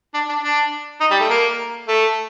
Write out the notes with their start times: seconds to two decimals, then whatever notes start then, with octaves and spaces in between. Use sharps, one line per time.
0.14 D4
0.29 D4
0.43 D4
1.00 D#4
1.11 G3
1.20 A3
1.29 A#3
1.88 A3